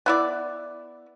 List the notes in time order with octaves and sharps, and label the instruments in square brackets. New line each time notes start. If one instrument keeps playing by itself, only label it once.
[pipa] B3 E4 D5